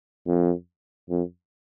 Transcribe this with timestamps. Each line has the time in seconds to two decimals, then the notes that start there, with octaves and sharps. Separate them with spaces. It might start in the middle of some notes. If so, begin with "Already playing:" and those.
0.27 F2
1.10 F2